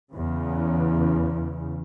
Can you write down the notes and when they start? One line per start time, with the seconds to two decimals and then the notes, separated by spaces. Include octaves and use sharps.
0.10 E2 C#3